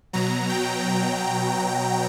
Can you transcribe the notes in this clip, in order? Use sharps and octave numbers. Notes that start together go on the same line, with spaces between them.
B2 F#3 A#5
G5